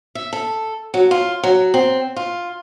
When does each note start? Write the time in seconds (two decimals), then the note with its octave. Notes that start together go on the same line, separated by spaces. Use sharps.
0.15 E5
0.33 A4
0.94 F#3
1.11 F4
1.43 F#3
1.74 C4
2.16 F4